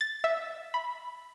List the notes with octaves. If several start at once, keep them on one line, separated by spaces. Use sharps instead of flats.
A6
E5
B5